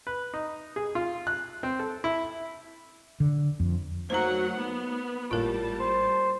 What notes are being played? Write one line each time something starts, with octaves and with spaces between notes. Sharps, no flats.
B4
D#4
G#4
F4
F#6
C4
A4
E4
D3
F2
F#3 A3 A#3 D#4 C5 F#5 A#5
B3
G#1 A2 G3 A#3 F4 A#4 A5
C5